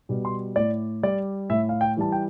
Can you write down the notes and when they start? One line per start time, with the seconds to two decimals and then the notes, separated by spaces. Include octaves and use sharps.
0.09 B2 G3
0.25 C6
0.56 A2 D5
1.03 G3 D5
1.50 A2 E5
1.69 F5
1.81 G5
1.97 E3 G3 A5
2.12 G5